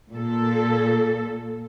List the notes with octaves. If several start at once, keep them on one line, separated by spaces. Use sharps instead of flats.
A#2 A4